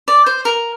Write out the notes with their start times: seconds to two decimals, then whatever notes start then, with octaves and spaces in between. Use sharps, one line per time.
0.08 D5
0.26 C5
0.45 A#4